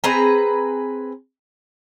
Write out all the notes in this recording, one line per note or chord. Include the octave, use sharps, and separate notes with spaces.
C4 G#4 B4 A#5